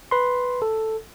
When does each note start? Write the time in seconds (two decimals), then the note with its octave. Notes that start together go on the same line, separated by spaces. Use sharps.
0.11 B4 B5 C6
0.62 A4